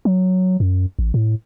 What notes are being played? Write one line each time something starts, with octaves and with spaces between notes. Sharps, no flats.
F#3
F#2
A1
A2